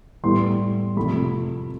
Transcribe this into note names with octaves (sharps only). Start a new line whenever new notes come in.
A2 G3 B3 C6
C3 F3 A3 B5